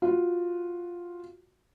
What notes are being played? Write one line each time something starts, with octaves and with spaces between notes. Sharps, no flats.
F4 F#4